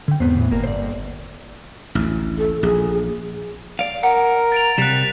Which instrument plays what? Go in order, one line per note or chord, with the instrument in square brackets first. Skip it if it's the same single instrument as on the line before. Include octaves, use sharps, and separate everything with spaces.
[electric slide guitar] D3 G5
[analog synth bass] E2 [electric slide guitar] G#2 B3 C4
[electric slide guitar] A2
[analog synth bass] G1 [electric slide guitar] A#3 A#4
[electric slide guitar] C5 D5
[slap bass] A1 D2
[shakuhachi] A4
[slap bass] A#1 [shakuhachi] G#4
[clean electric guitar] D5 F5
[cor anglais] A#4 [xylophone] F#5
[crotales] A6 D7 F7
[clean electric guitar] C2 G3 [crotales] F#6 B6 E7